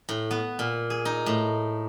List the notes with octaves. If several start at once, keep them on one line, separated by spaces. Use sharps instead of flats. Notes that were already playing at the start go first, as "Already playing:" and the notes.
A2
B3
A#2
G#4
D#4
A2